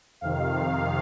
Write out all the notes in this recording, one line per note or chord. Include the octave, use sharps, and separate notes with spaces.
F2 C3 D#3 F5